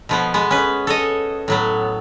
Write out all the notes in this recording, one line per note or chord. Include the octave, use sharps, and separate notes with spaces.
B2 F3 B3
G#3 B3
C#4 B4
A4 C#5 D#5
A2 F#3 B3